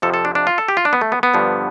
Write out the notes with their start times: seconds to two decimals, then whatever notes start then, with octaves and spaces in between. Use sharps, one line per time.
0.02 F2 C3 F3 A4
0.14 A4
0.25 D4
0.35 D4
0.47 F4
0.58 A4
0.68 G4
0.77 F4
0.85 D4
0.93 B3
1.01 A3
1.12 B3
1.23 B3
1.34 G2 D3 F3